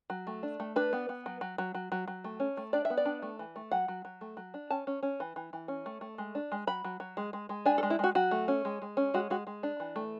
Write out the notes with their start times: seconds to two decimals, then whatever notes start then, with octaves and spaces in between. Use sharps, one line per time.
0.10 F#3
0.27 A3
0.43 D4
0.60 A3
0.76 D4 B4
0.93 B3
1.09 B3
1.26 F#3
1.41 F#3
1.58 F#3
1.75 F#3
1.92 F#3
2.08 F#3
2.24 A3
2.40 C#4
2.57 A3
2.73 D4 D5
2.85 E5
2.90 B3
2.97 D5
3.05 D4
3.22 A3
3.39 E3
3.56 A3
3.72 F#3 F#5
3.88 F#3
4.05 F#3
4.21 A3
4.37 F#3
4.54 D4
4.70 C#4 A5
4.87 C#4
5.03 C#4
5.20 E3
5.36 E3
5.53 E3
5.68 C#4
5.86 A3
6.01 A3
6.18 G#3
6.35 D4
6.52 G#3
6.67 F#3 B5
6.84 F#3
7.00 F#3
7.17 G#3
7.33 G#3
7.49 G#3
7.66 D4 G#5
7.78 A4
7.83 G#3
7.90 E4
7.99 G#3 F#4
8.15 F#3 F#4
8.31 A3
8.48 C#4
8.65 G#3
8.82 G#3
8.97 C#4
9.14 G#3 F#4
9.30 G#3 F#4
9.47 G#3
9.63 D4
9.80 E3
9.96 A3